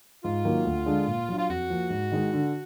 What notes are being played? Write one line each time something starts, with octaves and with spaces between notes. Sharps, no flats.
G#2 F4
D#3 F#3 A#3
D2
D3 G#3 D4
A#2
F#3 D4
F4
F2 F#4
F3 A#3
G#2
D#3 G#3 D#4
D3